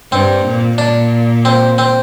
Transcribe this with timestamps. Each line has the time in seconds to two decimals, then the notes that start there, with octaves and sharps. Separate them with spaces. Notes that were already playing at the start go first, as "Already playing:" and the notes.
0.12 G2 C4
0.45 A#2
0.78 A#2 D4
1.45 C4
1.78 C4